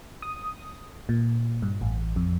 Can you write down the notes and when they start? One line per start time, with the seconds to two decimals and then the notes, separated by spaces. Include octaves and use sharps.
0.22 D#6
1.09 A#2
1.62 G2
1.81 A1
2.16 F2